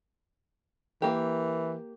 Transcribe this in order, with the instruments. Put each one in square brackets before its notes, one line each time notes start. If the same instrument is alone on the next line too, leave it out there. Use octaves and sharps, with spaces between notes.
[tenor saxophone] E3 [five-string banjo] A#3 G4